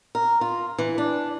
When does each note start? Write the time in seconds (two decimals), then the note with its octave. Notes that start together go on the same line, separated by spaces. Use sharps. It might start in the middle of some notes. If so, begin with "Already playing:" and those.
0.15 A#4
0.41 F4
0.78 E3
0.98 D4